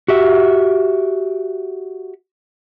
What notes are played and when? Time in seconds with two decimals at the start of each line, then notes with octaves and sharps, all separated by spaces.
0.08 F#4 G4 E5